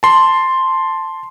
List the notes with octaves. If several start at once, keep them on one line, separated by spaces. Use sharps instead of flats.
A5 C6